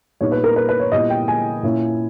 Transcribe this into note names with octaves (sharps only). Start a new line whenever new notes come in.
A#2 G3 B3 D#4 C#5
B4
A#4
B4
B4
C#5
A#2 G3 B3 E4 D#5
G5
G#5
A#2 A#3 C#4 E4